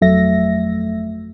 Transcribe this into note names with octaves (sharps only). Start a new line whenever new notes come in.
G1 F2 F#3 A3 E5 A#6